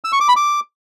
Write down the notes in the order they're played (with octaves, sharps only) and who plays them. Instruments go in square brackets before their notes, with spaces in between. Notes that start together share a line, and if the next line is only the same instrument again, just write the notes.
[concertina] E6
C#6
D6
B5
D6